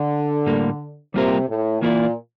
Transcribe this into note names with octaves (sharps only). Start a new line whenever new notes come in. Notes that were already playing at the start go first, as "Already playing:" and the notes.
Already playing: D3
A2 G3 A#3
C3 G3 A#3 F4 A#4
A2
A#2 E3 A#3 E4 A#4 D5